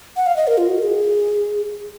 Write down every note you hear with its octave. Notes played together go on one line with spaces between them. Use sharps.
F#5
F5
D#5
A#4
F4
F#4
A#4
G#4